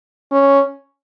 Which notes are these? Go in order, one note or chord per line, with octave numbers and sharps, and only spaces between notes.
C#4